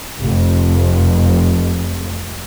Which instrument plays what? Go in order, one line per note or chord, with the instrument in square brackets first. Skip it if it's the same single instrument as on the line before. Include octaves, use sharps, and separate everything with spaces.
[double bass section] F1 F2